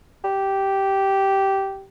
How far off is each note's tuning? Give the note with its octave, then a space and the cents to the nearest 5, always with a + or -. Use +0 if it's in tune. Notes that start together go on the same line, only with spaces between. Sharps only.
G4 -10